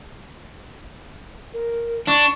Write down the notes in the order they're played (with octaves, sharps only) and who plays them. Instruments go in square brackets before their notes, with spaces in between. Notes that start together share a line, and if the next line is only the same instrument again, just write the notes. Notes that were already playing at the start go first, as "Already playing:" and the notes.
[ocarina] A#4
[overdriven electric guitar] D4 [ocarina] C#6